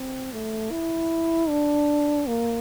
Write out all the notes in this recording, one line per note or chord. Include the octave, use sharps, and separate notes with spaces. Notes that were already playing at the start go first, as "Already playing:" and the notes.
Already playing: C4
A3
E4
D4
A#3